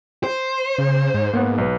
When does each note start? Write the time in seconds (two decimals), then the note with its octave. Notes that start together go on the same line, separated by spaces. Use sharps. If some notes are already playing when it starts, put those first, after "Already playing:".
0.24 C5
0.78 C#3
1.14 G#2
1.33 G#2 A#3 B3 F#5
1.58 B1 B4